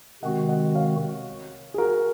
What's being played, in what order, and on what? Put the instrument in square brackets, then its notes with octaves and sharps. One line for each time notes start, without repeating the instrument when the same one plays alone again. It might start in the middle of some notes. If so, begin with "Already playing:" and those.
[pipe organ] C3 D#3 G#3 C4 F#4 [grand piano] D#5 F#5
[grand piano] D#5 F#5
C#5 F5
G#4
F#4 A#4